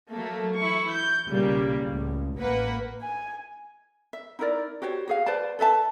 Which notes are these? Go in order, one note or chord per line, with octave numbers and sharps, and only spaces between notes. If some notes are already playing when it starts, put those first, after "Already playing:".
F#3 A3 A#3
E3 E4 C#6
G6
B1 A#2 C#3 G3 A#3
C#2 A2
A1 A#3 B4 F#5
G#5
E5
D#4 E4 A#4 D5
F#4 G4 C5 C#5
F#4 G#4 F5
B4 C5 D5 A5
A4 B4 E5 A5